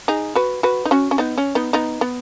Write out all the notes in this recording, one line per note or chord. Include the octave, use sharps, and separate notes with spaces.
D#4 G#4
F#4 B4
F#4 B4
D#4
C#4 F#4
C#4
B3 D#4
C#4
B3 D#4
B3 D#4
B3